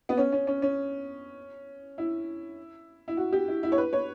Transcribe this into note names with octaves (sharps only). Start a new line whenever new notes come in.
B3
C#4
C#4
C#4
C#4
E4
E4
F#4
G4
E4
E4
C#5
B4
C#5